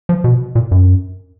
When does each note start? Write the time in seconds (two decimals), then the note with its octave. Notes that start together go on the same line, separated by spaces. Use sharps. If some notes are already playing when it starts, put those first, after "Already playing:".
0.09 F3
0.24 B2
0.55 A#2
0.71 F#2